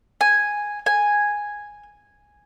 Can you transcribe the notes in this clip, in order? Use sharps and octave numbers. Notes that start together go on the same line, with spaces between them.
G#5
G#5